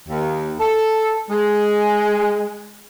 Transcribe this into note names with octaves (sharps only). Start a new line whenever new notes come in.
D#2
A4
G#3